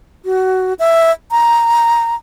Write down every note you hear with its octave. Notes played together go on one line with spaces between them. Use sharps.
F#4
E5
A#5